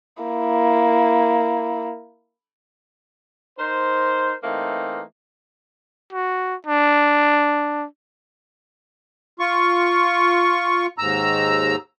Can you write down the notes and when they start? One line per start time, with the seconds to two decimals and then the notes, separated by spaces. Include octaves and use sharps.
0.23 A#3 E4
3.59 D#4 A#4 C5
4.43 E3 A3 A#3 C4 D#4
6.13 F#4
6.66 D4
9.39 F4 C#6
10.98 D#2 G#2 A#5 E6